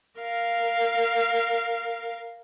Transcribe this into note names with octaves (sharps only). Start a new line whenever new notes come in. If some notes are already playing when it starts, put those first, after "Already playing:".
A#4 F5